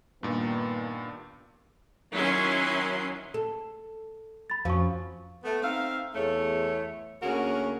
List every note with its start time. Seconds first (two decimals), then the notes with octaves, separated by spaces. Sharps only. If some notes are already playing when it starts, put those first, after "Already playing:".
0.23 G2 A#2 D#3 B3
2.13 D#3 F#3 C#4 E4 C6
3.34 A4
4.50 B5 A6
4.65 F2 F3 F#3 C#4 F5 C#6
5.43 A3 B3
5.62 C4 D#4 E5 F5
6.14 E2 A3 C#5
7.22 D2 A#3 C#4 F#4 G#4 A#4